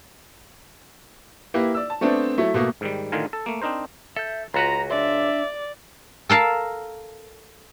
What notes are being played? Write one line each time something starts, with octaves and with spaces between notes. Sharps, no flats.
A#3 E4 G4 B4
D5 E6
A5
A3 B3 C4 D4
F#3 A3 E4
B2 A3 A#3
G#2 D#3 G3
A2 D3 D#3 F4 A#4 G#5
A4
A3 A#3
C4 D4 D#4 A#4 C5
A4 E5 G6
C#2 F4 F#4 B4 A#5 C6
D4 D5 E5 C6
A4 A#4 F5 A5